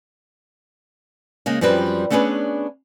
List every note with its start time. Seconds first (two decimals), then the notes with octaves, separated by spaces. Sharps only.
1.46 C#3 G#3 A#3
1.61 F#2 F3 G3 C4 B4
2.10 A3 B3 C#4 D4 G#4 B4